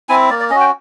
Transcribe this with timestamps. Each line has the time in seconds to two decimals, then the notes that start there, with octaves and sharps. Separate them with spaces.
0.09 C4 E4 G#5
0.30 A#3 D5
0.40 D5
0.50 C#4 D#5
0.55 F#4
0.61 G5